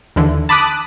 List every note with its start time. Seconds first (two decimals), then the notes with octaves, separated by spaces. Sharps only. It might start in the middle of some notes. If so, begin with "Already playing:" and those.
0.16 D#2 D3 E3
0.49 A5 B5 D6 D#6 F#6